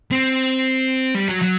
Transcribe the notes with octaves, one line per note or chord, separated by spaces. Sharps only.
C4
G3
F#3
F#3